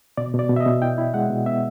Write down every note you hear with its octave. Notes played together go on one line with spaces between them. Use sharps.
B2 D5
B2
D5
B2
E5
D#5
B2
E4 G5
E4
G#3 F#5
B2
B3 E5